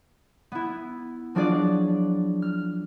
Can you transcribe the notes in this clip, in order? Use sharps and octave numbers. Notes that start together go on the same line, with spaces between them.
B3 E4
F3 F#3 D4 F4 G#4 D5
F6